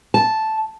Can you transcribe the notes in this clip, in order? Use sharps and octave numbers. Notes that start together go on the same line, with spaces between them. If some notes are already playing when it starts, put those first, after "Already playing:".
A5